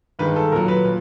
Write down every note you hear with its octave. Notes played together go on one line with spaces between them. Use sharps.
G2 D#3 G#3 B4
A4
A#2 F#3 A#4
B4
A#2